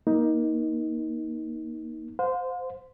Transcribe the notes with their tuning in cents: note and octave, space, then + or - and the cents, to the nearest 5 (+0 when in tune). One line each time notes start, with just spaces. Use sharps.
A#3 +20 D#4 +15
C5 -20 F5 +45